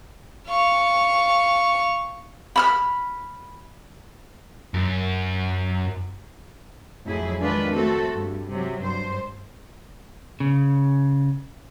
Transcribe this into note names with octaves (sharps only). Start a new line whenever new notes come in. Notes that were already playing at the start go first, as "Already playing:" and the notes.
F5 C#6
B5 E6 F6
F#2
F2 A2 F#3 E4 G#4
D#3 G#3 D4 F4 B4
A3 C4 F#4 A4
G2
C3 F#3
G2 C5
C#3